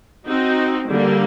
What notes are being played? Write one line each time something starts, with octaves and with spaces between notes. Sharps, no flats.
C4 D#4 F#4
D3 G3 A#3